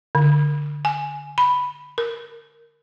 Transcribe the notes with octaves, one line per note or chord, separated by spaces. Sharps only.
D3
G#5
B5
A#4